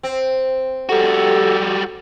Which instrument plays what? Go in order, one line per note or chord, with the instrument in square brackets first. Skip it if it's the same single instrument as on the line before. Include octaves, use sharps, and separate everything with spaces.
[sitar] C4
[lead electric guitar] G3 F#4 [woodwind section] G4 A4